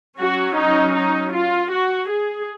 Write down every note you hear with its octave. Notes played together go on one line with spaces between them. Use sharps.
F#3 C#4 F#4
D#4
D#4
F4
F#4
G#4